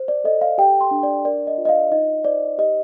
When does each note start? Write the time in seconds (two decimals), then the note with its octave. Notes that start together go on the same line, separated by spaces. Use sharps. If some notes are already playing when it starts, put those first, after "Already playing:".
Already playing: C5
0.08 D5
0.24 A4 D#5
0.41 F5
0.58 G4 G5
0.81 C6
0.91 D4
1.03 D5
1.25 A#4 D5
1.47 D#5
1.58 F4
1.65 D#5
1.69 F5
1.91 D#4 D#5
2.25 C5 D5
2.58 G4 D#5